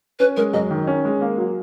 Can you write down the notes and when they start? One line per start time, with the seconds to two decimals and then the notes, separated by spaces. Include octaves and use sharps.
0.19 C#4 B4
0.37 G#3 A#4
0.54 F#2 D#5
0.71 D#3
0.87 C#4
1.05 G#3
1.21 A#3
1.38 F#3